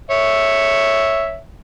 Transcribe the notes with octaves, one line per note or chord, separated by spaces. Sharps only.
C#5 E5